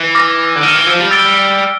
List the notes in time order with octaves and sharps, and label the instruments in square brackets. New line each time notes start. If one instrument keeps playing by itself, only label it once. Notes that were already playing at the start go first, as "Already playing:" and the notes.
Already playing: [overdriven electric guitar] E3
[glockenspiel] D6 F6 A#6
[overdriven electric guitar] D3
[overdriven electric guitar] D#3 [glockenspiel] D6 F6 A#6
[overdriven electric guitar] E3
F3
G3
[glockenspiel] E6 A6 D7 G7